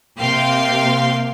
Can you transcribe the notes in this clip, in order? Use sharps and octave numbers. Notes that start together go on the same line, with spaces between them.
C3 A#3 F5 G5 C6